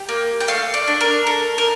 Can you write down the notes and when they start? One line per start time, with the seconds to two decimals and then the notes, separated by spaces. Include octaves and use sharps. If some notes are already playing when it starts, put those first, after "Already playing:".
Already playing: G4
0.09 A#3
0.40 G5
0.48 A3 F5
0.74 D5
0.87 D4
1.01 A#4
1.26 A4 A#4
1.58 A#4